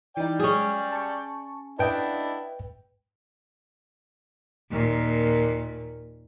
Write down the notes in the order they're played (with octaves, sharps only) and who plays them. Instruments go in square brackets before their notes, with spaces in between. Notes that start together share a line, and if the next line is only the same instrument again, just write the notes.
[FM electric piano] E3 D#4 [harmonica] D5 G5
[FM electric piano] F#3 G#3 [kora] C#4 G#4
[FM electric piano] A5 C#6
[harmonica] D4 E4 [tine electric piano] B4 G5 [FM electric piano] D#5 F#5
[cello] D#2 A#2